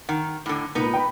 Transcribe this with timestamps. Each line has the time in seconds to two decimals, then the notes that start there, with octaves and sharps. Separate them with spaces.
0.09 D#3 F#5
0.46 A2 D3
0.75 C#2 A#2 B3 D#4 B4
0.94 G5 B5